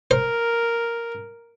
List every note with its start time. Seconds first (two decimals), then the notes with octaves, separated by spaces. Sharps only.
0.11 A#4 C5